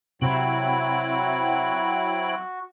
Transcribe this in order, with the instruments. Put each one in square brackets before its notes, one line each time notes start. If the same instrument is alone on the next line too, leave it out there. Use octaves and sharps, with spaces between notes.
[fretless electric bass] C3 [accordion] F#3 C4 E4 [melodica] F#4 [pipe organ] G5 B5